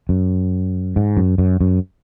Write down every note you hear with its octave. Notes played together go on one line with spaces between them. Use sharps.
F#2
G#2
F#2
F#2
F#2